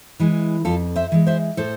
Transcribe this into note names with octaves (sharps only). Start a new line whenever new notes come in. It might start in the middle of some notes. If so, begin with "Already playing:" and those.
E3 G#3
F2 F4 A4
C5 E5
E3 G#3
C5 E5
A2 A4 C5